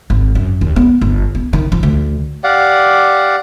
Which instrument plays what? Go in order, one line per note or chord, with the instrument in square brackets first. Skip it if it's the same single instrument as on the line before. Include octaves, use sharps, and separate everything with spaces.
[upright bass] G#1
F#2
D#2
B3
G1
B3
D#3
F3
D2
[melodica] G4 D5 F5 F#5